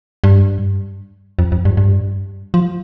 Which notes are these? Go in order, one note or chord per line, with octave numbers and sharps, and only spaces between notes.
G2
F2
F2
G2
G2
F3